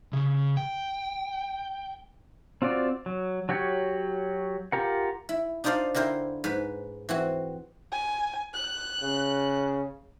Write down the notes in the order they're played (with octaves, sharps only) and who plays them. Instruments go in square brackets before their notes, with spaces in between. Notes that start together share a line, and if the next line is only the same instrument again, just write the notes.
[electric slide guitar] C#3
G5
[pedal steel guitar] C4 F4 F#4 D5
F#3
F#3 F#4 G4 C#5 F#5
F4 G4 A#4 F#5
[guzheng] E4
D4 D#4 F4 C5 D5 F5
D3 E4 A#4 C5 G5
G#2 B4
E3 C4 F#4
[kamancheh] G#5
F#6
[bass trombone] C#3